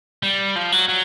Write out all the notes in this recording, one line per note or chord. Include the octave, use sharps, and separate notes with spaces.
G3
F3
F#3
F#3